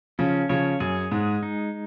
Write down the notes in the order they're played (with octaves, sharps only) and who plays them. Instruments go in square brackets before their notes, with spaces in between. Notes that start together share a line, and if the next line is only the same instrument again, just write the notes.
[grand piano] C#3 F3 [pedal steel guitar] C#4
[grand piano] C#3 F3 [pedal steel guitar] C#5
[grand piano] F#2 [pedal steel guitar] G#4
[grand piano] G#2 [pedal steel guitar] G#3
[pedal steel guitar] D#4